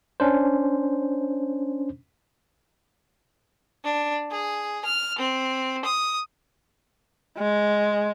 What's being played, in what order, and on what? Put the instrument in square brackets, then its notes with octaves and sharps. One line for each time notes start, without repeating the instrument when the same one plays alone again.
[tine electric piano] C#4 D4 C5
[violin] D4
G#4
F6
C4
D#6
[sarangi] G#3